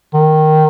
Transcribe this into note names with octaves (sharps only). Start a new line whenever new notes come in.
D#3